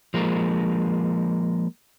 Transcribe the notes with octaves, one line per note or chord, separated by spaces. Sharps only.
F3 G#3 A#3